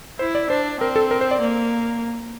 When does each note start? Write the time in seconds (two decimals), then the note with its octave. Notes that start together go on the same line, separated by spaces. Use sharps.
0.19 E4 C5
0.35 D5
0.50 D4 C5
0.81 C4 A#4
0.96 A4
1.11 A#4
1.21 C5
1.31 D5
1.41 A#3